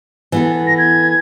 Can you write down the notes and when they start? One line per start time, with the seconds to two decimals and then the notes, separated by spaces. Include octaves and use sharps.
0.32 E3 B3 A4
0.67 A#6
0.78 G#6